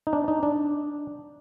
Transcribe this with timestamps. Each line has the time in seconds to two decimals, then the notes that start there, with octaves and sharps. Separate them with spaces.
0.07 D#4
0.13 D4
0.28 D#4
0.43 D4